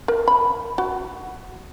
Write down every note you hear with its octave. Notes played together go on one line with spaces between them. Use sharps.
A#4
B5
F#4